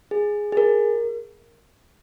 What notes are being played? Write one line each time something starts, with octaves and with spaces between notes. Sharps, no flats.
G#4
G#4
A#4